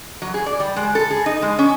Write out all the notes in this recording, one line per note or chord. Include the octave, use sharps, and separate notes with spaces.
F#3
G#4
D5
G3
G#3
A4
G#4
D#4
G#3
C#4